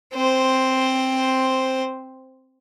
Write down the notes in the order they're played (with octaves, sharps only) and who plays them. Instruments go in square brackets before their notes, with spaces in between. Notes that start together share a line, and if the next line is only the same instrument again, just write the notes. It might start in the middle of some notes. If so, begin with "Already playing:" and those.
[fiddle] C4 C5